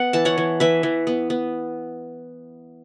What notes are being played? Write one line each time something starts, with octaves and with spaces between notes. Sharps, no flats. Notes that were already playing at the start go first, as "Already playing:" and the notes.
Already playing: B3 F#5
E3 A5
C#5 F#5
E3
E3 B4 E5
E3
B3
B3